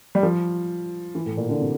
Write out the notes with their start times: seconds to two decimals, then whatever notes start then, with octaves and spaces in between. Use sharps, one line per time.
0.15 G3
0.23 F3
1.15 E3
1.26 A2
1.37 A#2
1.49 D3
1.60 C3